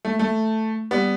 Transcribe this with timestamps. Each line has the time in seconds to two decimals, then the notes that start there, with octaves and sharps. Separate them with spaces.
0.05 A3
0.19 A3
0.91 G3 B3